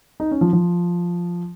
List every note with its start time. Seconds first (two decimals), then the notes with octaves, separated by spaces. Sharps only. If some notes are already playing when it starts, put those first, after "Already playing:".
0.20 D#4
0.31 C#4
0.41 F3
0.53 F3